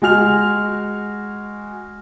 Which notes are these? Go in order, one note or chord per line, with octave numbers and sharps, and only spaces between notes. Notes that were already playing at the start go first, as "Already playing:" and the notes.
G#3 F#4 G#5 F6 F7